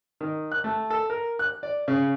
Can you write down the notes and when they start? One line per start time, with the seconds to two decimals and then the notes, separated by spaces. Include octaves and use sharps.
0.21 D#3
0.52 F#6
0.64 A3
0.90 A4
1.10 A#4
1.39 F#6
1.63 D5
1.88 C#3